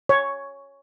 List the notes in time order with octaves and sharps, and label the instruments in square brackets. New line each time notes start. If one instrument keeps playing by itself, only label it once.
[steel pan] C#5